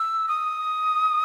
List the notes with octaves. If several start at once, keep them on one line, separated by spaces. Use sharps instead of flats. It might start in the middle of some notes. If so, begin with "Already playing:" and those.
Already playing: E6
D#6